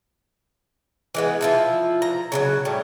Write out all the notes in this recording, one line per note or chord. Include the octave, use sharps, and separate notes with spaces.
E3 G#3 B3
F3 E4 F4
A#5
C#3 E3 F#3
A2 G3